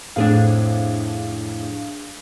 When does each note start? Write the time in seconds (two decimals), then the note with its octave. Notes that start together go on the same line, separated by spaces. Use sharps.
0.16 F2 A2 C4 D4 G#4 F5